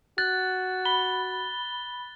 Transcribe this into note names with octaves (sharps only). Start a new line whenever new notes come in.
F#4 F#6 A6
B5 G7